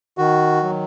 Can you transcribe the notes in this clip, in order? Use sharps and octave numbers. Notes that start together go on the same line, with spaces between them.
D#3 F#4
F#3